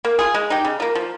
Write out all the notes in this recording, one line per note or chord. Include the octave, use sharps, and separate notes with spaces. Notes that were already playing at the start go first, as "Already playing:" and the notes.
A#3
F4 G#4
G#3
D#4 G4
C#3
F3 A#3
F3